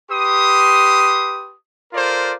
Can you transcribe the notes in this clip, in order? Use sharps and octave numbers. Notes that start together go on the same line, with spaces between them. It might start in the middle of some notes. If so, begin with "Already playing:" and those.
G4 B4 C6 D#6
F4 A4 A#4 C5 D5